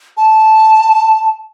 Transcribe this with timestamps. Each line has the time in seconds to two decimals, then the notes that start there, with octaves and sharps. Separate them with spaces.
0.17 A5